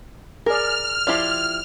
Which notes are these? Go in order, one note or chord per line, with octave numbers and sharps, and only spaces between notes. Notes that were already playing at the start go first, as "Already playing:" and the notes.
G#4 A#4 D5 F6
F3 E4 G4 D5 C6